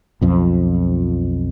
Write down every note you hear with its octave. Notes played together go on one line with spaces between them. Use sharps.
B1 F2 F3